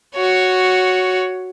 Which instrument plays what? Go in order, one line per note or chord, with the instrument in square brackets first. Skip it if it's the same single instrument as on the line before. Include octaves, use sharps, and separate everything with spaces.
[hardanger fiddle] F#4 C#5